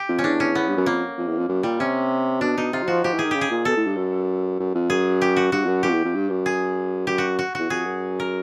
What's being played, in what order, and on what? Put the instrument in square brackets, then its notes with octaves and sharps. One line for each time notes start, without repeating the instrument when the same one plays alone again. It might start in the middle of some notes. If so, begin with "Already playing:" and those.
Already playing: [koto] G4
[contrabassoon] F2
[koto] C#4
[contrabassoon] E2 [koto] D4
[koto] C#4
B3
[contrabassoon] G2
F#2
[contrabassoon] F2 [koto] A#3
[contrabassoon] F2
E2
F2
F#2
[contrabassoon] A#2 [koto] G3
[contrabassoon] C3 [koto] C#4
[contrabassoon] B2 [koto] D4
[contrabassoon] B2 [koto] D#4
[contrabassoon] C3 [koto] F4
[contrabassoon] F#3
[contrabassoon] F3 [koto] F#4
[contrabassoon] F3 [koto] G4
[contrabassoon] E3 [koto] G#4
[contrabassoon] D#3
[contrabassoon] C#3 [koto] G4
[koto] G#4
[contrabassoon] A#2
[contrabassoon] B2 [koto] A4
[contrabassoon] A2
G2
F#2
F#2
F2
[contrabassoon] F#2 [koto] G#4
[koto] G4
F#4
[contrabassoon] G2 [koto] F#4
[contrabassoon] F2
F#2
[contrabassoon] F#2 [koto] G4
[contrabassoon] F2
E2
F2
G2
F#2
[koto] G#4
[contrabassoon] F#2 [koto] G4
[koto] F#4
F#4
[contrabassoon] E2 [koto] F#4
[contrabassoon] F2 [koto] G#4
[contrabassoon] F#2
[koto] A#4